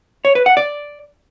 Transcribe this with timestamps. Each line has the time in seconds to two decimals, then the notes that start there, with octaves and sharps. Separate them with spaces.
0.25 C#5
0.35 B4
0.46 F#5
0.57 D5